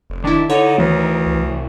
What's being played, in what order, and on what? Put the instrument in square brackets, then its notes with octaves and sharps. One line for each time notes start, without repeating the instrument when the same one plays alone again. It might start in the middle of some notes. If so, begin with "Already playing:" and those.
[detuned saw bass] F1
[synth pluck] D#3 E4 [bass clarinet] D4
[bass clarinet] D3 [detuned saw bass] D#4 [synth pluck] C#5
[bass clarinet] D2 [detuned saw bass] D#3 [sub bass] E3
[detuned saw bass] D#3
C2